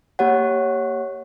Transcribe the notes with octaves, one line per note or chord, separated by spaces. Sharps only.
A#3 G4 C#5 F#5